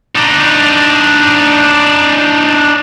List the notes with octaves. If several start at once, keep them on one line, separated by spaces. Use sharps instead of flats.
D4 D#4